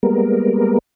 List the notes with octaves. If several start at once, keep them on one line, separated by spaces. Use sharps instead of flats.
G3 G#3 A#3 B3 A#4